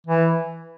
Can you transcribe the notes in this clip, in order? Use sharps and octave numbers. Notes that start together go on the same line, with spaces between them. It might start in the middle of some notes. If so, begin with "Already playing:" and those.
E3